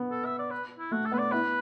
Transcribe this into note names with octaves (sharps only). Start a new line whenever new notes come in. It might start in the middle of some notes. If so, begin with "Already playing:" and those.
Already playing: B3
A4
E5
D5
B4
E4
A3 F#4
A4
B3 B4
D5
B3 E4 B4